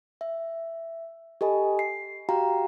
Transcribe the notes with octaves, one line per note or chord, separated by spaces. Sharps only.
E5
G4 A4 D#5 G#5 B5
C7
F#4 G4 F5 G5 A#5